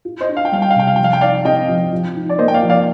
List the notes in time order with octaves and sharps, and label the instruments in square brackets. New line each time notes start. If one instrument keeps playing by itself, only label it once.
[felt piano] F4
[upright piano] C5 D#5
[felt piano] D4
[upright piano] F5
G5
[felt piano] G3 [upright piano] F5
[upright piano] G5
F5
[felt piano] C3 [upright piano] G5
[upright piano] F5
[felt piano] F3 [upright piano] G5
[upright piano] F5
G5
[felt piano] D#4 [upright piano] D5 F5
[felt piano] C4 [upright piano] D#5 G5
[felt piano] F3
F3
D#4
[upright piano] D5
[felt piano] A#3 [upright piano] C5 D#5
[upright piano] G5
D5 F5
[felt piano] F3
[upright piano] D5 F5